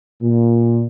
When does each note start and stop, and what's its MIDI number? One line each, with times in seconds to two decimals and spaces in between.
0.22 0.84 46